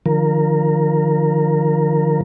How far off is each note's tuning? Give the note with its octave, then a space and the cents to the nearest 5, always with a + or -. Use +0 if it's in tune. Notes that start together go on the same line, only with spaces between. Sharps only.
D3 +45 F3 +0 A#4 +0